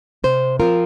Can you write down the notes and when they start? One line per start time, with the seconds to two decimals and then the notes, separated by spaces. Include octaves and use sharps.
0.24 C3 C5
0.60 F3 C4 F4 A#4